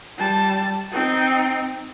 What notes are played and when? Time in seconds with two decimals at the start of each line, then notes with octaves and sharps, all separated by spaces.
0.18 G3 A5
0.92 C4 D#4